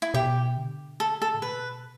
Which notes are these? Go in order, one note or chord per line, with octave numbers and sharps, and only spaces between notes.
E4
B2 G4
D3
A4
A4
A2
B2 B4